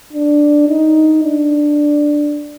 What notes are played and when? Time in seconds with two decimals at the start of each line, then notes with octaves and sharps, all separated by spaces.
0.13 D4
0.69 D#4
1.24 D4